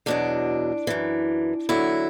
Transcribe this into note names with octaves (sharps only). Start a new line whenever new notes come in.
E2 B2 F#3 D4
F#2 E3
E2 D3 F#3 E4